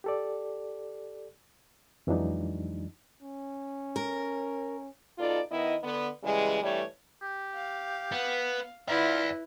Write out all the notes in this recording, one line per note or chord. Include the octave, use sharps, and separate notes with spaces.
G4 A4 D5
F2 E3 F#3 G#3 D4 D#4
C#4
A#4
B2 D#4 F4 A4 D5
D#3 B3 E4 D#5
D3 B3
C#3 E3 G3 G#3
G2 E3 G3 A3 C#5
G4
F5
B3
E4 F4 B4 D5 E5